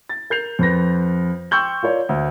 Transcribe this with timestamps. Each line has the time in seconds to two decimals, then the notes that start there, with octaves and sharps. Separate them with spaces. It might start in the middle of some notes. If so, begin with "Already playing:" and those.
0.09 A6
0.30 A#4 G6 C7 F7
0.59 F2 B4 A#6
1.51 G5 C6 C#6 E6 G6 F#7
1.83 F4 A#4 C#5 D5
2.09 D2